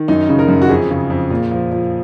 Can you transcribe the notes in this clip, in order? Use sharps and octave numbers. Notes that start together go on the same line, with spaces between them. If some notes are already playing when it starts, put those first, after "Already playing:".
Already playing: D#3
F#2 D#4
C#3
A#4
F#2
F#4
F2 G#4
C#3
F2
A#2
F3
F3